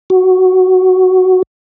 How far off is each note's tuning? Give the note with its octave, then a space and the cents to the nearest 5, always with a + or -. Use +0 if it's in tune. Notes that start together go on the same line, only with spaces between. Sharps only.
F#4 +5